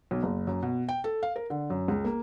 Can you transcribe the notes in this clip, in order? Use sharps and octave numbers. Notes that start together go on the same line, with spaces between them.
B1
F#1
F#2
B2
G5
A4
F5
A#4
D3
F#2
C#2
A#3